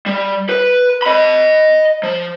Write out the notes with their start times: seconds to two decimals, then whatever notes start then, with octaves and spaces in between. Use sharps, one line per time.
0.06 G3
0.49 B4
1.02 D#5 B5
2.03 F3